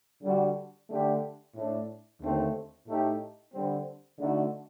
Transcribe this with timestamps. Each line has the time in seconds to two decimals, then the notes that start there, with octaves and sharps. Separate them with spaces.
0.23 D3 G3 D4 F#4
0.89 D3 A3 D4 G4
1.55 A2 A3 D4
2.21 D#2 D3 A3 C4
2.87 A2 A3 D#4 G4
3.52 D3 G3 C4
4.18 D3 A3 D#4 F#4